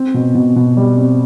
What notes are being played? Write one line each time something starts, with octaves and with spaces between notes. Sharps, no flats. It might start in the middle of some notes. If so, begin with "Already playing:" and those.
Already playing: C4
B2
B2
B2
G3
C4